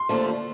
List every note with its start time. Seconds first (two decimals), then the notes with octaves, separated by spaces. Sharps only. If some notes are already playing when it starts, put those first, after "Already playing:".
Already playing: C6
0.09 D#2 D3 F3 A3